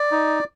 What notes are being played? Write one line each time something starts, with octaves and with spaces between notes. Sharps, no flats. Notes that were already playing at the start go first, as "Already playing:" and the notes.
Already playing: D5
D#4